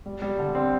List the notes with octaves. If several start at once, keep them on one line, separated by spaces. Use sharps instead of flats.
G3
G3
D3
C4